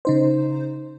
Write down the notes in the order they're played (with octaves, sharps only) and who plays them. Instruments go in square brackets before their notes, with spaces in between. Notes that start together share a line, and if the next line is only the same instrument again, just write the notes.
[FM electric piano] C#3 D#4 C5